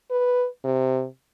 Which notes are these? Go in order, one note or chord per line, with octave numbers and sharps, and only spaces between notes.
B4
C3